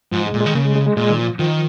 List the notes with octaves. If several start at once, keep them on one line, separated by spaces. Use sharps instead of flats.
G#2 F3
G#3
A#2
G#3
D#3
C#3 A#3
G#3
G#3
G#3
A#2 G#3
D#3
F3
D#3 F3